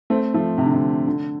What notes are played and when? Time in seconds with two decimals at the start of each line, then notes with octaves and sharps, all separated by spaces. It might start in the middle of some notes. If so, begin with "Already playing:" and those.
0.10 A3 C4
0.34 F3 A3
0.58 C3
0.66 D3
0.74 C3
1.07 D3